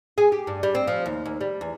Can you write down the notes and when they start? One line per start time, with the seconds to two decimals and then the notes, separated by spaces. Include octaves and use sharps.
0.18 G#4
0.32 G4
0.47 G2
0.63 G3
0.75 C4
0.88 F3
1.06 D#2
1.26 D#2
1.41 G3
1.61 E2